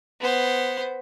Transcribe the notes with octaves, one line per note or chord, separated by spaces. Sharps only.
B3 C5